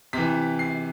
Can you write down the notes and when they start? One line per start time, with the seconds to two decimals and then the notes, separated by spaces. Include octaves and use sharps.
0.13 C3 E3 B6
0.59 C7